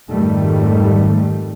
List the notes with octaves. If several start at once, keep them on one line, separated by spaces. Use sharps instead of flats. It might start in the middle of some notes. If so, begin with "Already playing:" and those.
F2 G#2 D#3 G3 A3